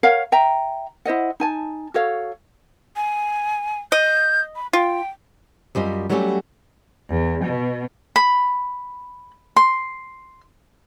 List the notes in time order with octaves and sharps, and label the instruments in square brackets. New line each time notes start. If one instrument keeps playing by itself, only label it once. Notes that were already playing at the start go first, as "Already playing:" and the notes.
[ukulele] A#4 C#5 F5 F#5
E5 G5 A#5
E4 C5 D#5 F#5
D#4 G#5 A5
F#4 A4 C#5 F5
[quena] G#5
[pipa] D#5 [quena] G6
[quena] B5
[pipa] F4 [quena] G5
[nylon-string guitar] F#2 G3 F4 D#5
F#3 G3 A3 C#4 F4 G4
[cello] E2
B2
[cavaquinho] B5
C6